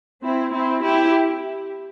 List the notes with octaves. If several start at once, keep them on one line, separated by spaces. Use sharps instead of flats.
C4 E4
C4 E4
E4 G4